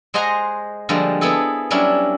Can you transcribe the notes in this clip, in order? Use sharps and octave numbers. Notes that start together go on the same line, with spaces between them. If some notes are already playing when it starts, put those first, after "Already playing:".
G#3 C5 D#5 F#5 G#5 A#5
D3 F3 G3 G#3 A#3
B3 E4 G#4 A4
F#3 G3 C#4 D4 E4